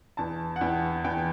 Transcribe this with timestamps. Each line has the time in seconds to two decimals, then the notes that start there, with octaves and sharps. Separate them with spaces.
0.17 E2 A5
0.56 F#5
0.61 E2 G5
1.04 E2 G5